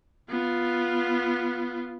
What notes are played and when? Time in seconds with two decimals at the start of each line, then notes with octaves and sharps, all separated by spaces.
0.29 B3 F4